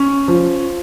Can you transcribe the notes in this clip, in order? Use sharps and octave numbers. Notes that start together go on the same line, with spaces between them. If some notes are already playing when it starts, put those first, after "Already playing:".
Already playing: C#4
F3